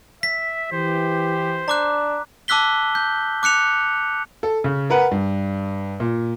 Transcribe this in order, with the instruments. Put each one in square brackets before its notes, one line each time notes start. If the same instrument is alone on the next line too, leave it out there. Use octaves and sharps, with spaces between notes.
[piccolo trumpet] E5 [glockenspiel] B6
[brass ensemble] E3 G4 [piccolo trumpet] C5
[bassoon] D4 [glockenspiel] A#5 D6 F#6
[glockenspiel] A5 D6 E6 F#6 B6 G7
G6
D6 F#6 C#7 F7
[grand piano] A4
C#3
A#4 B4 F#5
G2
A#2